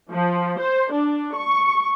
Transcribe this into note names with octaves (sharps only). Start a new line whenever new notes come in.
F3
C5
D4
C#6